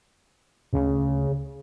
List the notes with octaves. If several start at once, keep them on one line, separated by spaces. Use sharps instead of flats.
D2 C#3